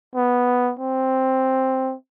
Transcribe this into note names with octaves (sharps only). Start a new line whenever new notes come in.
B3
C4